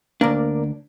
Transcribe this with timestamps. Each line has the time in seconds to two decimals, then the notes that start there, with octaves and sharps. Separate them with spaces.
0.21 D2 A#3 D4 A#4 D5